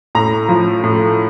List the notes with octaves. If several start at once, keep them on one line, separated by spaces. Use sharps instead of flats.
A2 A#5
F3
A2